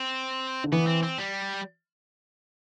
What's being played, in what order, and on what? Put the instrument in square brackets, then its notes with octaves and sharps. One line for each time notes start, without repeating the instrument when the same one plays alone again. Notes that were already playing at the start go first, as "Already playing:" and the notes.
Already playing: [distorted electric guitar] C4
[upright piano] D3
[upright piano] E3 [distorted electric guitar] B3
[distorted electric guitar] C4
C4
G3